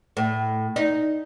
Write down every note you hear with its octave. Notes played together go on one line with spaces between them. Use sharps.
A2
D#4